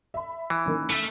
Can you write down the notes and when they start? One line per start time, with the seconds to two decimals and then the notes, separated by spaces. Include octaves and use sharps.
0.14 E5 B5
0.50 E3
0.66 D#3 A#3 C#4
0.90 A3 E5 F6